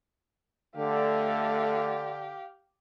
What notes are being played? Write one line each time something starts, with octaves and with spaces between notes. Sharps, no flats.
D3 A3 G4 F5